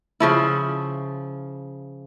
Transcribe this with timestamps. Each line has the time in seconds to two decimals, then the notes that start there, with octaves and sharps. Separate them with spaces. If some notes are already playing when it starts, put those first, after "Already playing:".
0.20 C#3 F3 E4